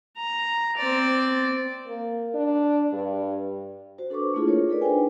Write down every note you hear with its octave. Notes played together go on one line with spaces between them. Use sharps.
A#5
C4 D5
A#3
D4
G2
F#4 C5
D4 A4 B4 C#6 D6
A3 A#3 D4 E4 F4 G#4
F4 G#4 A#4 C#5
D#4 G#4 A4 B4 D5
D4 B4 C5 G5 G#5